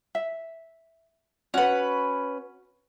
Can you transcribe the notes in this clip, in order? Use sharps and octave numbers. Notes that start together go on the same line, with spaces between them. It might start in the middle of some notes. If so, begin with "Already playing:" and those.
E5
C#4 F#4 B4 F#5